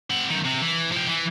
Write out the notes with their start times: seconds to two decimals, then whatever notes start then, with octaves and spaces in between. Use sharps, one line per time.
0.10 C4 F#5
0.30 F#2 D#3
0.45 C3
0.61 E3
0.92 F3 G4
1.09 E3